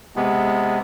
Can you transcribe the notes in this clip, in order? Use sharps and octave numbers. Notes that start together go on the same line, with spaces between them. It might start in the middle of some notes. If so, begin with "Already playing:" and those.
C3 G#3 B3